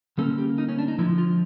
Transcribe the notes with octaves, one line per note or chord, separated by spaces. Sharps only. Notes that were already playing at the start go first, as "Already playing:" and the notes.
D3 G3 A#3 C#4 A4
G4
D#4
C#4
D4
D#4
D3 F3 G#3 E4
F4